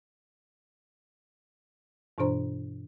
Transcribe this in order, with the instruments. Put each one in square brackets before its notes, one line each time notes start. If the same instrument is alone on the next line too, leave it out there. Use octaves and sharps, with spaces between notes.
[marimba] G2 B2 E3 D4 C5 A#5